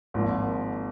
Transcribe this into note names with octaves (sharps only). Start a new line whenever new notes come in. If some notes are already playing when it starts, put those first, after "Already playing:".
G#1 G#2 F3 A#3